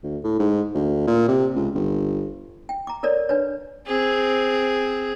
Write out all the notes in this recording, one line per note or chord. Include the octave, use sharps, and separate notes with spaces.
D2
A2
G#2
D2
A#2
C3
C#2
G1
G5
A#5 D6
A4 A#4 C#5 D5
D4 B4 C#5
C4 G#4